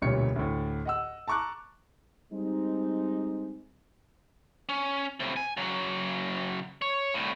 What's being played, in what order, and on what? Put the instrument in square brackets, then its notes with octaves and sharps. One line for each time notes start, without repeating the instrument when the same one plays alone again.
[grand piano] E1 D2 A#2 G3 C#5 C#7
D2 A2
D#5 F#5 E6
A5 A#5 C#6 D6 F#6
[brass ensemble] G3 G#3 C4 D#4
[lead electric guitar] C#4
A2 C3
G#5
C#3 F#3
C#5
C2 A2